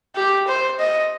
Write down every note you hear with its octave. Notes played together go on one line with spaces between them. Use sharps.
G4
C5
D#5